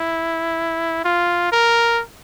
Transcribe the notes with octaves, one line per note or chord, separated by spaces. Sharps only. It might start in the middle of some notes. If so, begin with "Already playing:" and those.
Already playing: E4
F4
A#4